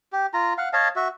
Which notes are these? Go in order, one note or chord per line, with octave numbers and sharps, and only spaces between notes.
G4
F4 A#5
F5 F#5
C#5 D#5 F5 A5
F#4 E5